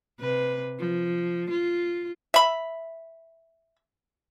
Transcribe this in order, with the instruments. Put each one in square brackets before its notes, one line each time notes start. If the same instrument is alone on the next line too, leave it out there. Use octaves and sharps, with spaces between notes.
[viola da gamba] C3 B4
F3
F4
[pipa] E5 B5